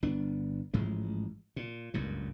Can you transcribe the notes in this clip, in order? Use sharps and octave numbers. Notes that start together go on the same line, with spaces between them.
G1 B3 D4
A1 G#2 F3 G#3
A#2
F#1 C#2 G2 A#2